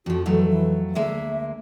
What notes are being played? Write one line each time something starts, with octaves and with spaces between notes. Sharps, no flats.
F2 F3 F#4
F2 E3 F#3 A3
E3
D2 G#3 A#3 E5